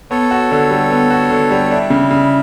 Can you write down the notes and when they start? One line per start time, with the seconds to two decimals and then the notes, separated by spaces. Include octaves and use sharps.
0.11 B3 A4 C#5
0.31 F#4
0.51 D3
0.71 G3
0.91 B3
1.10 F#4
1.31 D3
1.51 G3
1.71 D4 E4
1.90 C#3
2.11 C#3